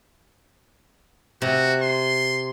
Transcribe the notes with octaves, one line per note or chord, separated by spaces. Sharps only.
C3 F#4
C6